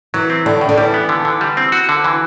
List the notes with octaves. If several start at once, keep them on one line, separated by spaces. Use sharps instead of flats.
E3 F#3
C4
A2 D3
A2
D3
E3 G3
B3
D3
D3
G3
C4
F#4
D3
E3